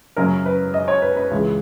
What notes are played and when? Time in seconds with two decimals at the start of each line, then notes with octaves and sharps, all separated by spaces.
0.16 F#2 C#3 F#3 C#4 A#4
0.46 B4
0.74 D#5
0.88 C#5
1.02 B4
1.17 B4
1.31 C#2 C#3 E3 G#3